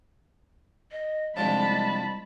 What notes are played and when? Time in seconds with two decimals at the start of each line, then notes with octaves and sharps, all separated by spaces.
0.92 D#5
1.37 C2 D3 F3 G#3 A5 B5